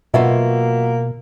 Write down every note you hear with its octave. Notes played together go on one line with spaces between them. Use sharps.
B2 F#3 A#3 F4 F#4 B4 D#5 E5